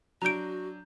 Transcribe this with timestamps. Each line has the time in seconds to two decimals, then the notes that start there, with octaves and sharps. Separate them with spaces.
0.22 F#3 D4 F#4 A#5 G6 D7